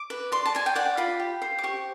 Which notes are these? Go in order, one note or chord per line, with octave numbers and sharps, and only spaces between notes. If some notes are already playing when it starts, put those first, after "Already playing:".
Already playing: D6
B4
D5 C6
A5
D5 G#5
G5
D5 F#5
F4 B5
G4
C5
D6
G4 C#6